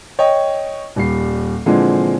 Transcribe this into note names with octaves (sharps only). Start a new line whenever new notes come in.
C#5 D#5 G5
D#1 G3 C7
A#2 D3 E3 F3 G#3 C4